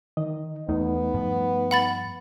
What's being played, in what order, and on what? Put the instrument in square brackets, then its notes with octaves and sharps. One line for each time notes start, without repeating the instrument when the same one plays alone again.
[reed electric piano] D#3 D#5
[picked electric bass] E2 [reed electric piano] A3 D#4 D#5 [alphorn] B3
[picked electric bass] G2 F3
[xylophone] F#5 B5 A6